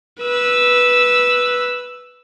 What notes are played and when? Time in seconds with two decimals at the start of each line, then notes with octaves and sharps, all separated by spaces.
0.22 B4 E6